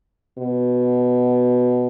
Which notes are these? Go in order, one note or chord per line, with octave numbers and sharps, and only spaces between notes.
B2